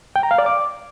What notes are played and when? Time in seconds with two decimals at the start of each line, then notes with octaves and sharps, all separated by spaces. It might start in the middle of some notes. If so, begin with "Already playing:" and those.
0.16 G5
0.23 A#5
0.31 F5
0.38 D5
0.46 D6